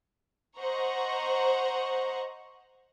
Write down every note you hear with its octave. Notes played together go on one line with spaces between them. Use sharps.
C5 D#5 F#5 A#5 C#6